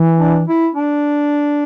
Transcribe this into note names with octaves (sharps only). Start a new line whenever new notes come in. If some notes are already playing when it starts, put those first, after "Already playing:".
Already playing: E3
D4
E4
D4